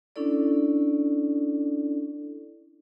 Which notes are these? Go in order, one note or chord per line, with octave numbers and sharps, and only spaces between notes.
C#4 D4 E4 A4 D5